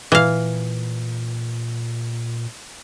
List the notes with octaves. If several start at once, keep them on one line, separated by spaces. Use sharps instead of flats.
A#2 E3 F5